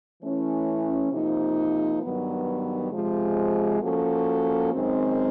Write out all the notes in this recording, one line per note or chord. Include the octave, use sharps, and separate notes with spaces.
E3 A3 C#4 E4
C3 F3 A#3 D#4
G2 D#3 F#3 B3
C3 F3 G#3
F3 A#3 C#4 F#4 A4
F#2 D#3 G#3 C4